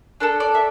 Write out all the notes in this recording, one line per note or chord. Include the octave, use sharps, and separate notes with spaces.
D4 A4 A#4
D5
E5